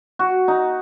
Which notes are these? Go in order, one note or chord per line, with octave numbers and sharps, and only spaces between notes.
F#4
D#4